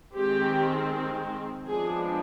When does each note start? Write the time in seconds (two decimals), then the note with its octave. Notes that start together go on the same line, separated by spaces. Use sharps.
0.15 D#3 G#3 C4 G4
1.66 F3 G#3 B3 D4 G#4